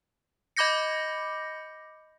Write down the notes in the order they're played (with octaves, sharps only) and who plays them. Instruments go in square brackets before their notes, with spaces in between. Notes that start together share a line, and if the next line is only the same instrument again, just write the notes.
[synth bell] D#5 B5 D6 G6 A#6 C#7